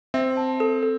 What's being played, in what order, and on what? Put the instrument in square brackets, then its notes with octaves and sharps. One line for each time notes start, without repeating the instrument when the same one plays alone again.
[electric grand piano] C4 [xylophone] E5
[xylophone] A5
A4
A4